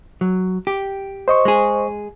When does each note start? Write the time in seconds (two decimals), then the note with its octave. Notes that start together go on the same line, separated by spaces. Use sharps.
0.21 F#3
0.67 G4
1.28 C5 D#5 C#6
1.45 G#3 G#4